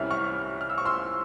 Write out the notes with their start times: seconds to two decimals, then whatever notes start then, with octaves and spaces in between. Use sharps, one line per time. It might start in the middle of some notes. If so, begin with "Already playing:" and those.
Already playing: C2 C3 G3 C#4 E4 F6
0.11 C#6 F6
0.61 F6
0.70 E6
0.78 C#6
0.85 C6 E6